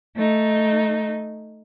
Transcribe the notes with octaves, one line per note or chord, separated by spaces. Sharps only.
A3 D#4